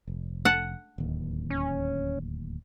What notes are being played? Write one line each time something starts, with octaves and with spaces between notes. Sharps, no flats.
F1
F#5 A5
D1 D#2
C#4